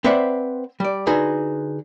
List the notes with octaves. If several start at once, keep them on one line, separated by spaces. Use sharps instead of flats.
C4 B4 C5 D5 E5 F#5
G3 D5
D3 D#4 F#4 G#4 B4